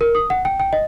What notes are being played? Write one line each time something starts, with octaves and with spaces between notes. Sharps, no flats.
A#4
D#6
F#5
G5
G5
D#5